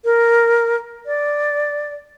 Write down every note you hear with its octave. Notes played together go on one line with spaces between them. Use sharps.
A#4
D5